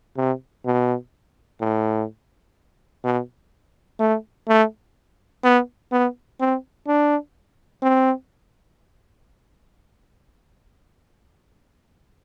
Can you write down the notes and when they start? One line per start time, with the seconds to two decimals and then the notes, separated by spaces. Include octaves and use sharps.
0.17 C3
0.66 B2
1.61 A2
3.04 B2
4.00 A3
4.48 A3
5.44 B3
5.92 B3
6.40 C4
6.87 D4
7.83 C4